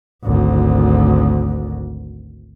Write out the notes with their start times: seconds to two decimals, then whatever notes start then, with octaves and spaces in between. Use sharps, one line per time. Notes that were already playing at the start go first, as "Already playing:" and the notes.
0.24 G#1 D2